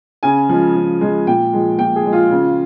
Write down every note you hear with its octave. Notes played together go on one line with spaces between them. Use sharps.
C#3 G#5
F3 G#3
C#3
F3 G#3
A#2 G5
F3 G#3
A#2 G5
G#4
F3 G#3
F4
C#3